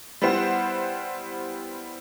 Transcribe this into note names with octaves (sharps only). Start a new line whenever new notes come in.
G3 B3 E4 C5 F#5